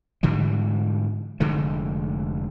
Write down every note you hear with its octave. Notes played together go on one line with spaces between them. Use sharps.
G#2 D3 E3 G3
F1 D3 G#3 A3